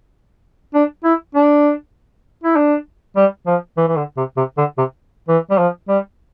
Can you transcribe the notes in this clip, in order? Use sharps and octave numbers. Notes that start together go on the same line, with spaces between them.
D4
E4
D4
E4
D4
G3
F3
E3
E3
D3
C3
C3
D3
C3
E3
G3
F3
G3